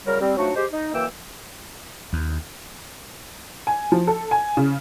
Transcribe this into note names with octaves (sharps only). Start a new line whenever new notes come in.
C#3 F#3 G3 A#4
G3 C4
F3 F#3 A3 D4 D#4 F#4
G#3 G4 C5
D#4
F#2 E3 A#3 G5 E6
D#2
G#5
F3
A4
G#5
C#3